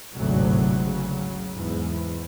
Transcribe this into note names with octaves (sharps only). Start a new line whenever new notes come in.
G#1 D2 A2 C3 F#3
C#3 F#3
E2 G#2